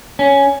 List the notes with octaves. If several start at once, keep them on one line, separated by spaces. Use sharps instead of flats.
C#4